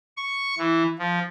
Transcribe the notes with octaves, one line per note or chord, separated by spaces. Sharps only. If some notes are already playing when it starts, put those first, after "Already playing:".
C#6
E3
F3